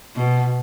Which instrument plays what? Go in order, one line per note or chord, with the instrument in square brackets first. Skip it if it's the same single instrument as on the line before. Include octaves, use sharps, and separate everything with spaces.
[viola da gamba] B2